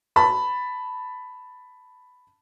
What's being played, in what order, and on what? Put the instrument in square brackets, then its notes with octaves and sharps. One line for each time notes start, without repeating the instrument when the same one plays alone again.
[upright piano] A5 B5